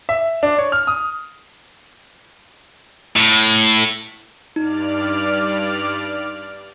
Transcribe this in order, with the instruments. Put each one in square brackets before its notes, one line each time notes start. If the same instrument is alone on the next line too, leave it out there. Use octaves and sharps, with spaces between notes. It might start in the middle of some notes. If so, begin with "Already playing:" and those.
[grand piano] E5
D4
C#5
F6
D#6
[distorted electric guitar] A2
[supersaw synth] G2 D5 F6 [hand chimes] D#4